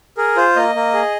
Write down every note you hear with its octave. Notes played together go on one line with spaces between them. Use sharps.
G#4 A#4
F4 C5
A#3 D#5
A#3
G#4